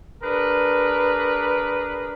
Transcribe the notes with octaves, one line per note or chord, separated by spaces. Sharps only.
D4 G#4 A#4 B4